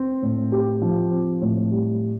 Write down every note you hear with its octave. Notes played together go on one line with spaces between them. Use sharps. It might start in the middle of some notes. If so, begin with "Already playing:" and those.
Already playing: C4
A2
G4
F3
C4
A2
G3